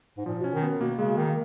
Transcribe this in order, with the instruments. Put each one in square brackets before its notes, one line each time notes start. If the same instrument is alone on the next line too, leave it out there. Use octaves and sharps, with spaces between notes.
[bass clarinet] G#2
[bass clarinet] A#2 [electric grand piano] F3
[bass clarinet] B2 [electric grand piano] C#4
[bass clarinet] D#3
[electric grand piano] B3
[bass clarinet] B2 [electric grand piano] A#3
[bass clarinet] C#3 [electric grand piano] G#3
[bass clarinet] D#3 [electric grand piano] A#3